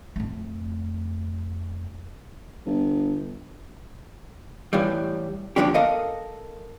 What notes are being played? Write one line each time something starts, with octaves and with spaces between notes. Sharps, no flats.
F2 A3
G1
A2 E3 G3
A#2 D3 E3 F3 D4 G4
A4 A#4 D#5 F5